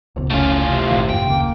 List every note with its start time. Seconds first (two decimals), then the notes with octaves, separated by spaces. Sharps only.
0.16 D1 B1 C#3
0.30 F1 C#2 A2 C#4 F4
0.63 C3
0.91 G#1 A#2 D#3
1.09 F2 G#2 G5
1.26 D1 C#3 A#3